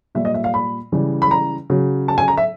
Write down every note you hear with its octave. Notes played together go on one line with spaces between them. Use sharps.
A#2 G3 E5
D#5
E5
F5
B5
C#3 E3 G3
B5
A#5
C#3 F#3
A5
G#5
A#5
E5